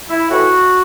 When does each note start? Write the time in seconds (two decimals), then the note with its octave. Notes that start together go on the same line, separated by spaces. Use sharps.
0.09 E4
0.30 A2 E3 F#4